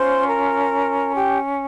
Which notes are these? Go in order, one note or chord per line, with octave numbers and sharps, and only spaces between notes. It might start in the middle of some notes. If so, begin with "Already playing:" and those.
Already playing: C#4 F4 C5 C6
A#4 A#5
G4 G5